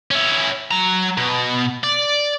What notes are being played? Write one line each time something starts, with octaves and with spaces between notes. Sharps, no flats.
C#4 E4
F#3 A#5
B2
D5